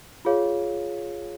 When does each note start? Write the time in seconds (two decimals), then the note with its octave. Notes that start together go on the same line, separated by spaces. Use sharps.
0.25 F4 G#4 C#5 F5